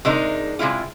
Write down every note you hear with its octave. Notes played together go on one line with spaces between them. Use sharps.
C3 G#3 D4 D#4 A#4
C3 G#3 E4 F4